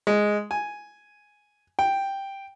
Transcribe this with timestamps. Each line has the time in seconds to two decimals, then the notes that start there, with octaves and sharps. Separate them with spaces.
0.07 G#3
0.51 G#5
1.79 G5